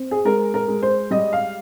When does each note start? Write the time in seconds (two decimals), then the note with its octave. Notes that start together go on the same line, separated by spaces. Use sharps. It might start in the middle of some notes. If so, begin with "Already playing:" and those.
Already playing: C4
0.11 G#4
0.25 G#3 A#4
0.54 A#4
0.68 G#3
0.82 C5
1.11 G3 D#5
1.33 F5